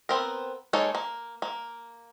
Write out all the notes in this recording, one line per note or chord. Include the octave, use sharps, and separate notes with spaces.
B3 C4 A#4
G#3 A#3 D#4 A4 C#5
A#3
A#3